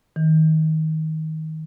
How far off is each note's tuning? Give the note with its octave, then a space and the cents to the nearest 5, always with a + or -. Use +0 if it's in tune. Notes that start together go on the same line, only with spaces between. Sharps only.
D#3 +20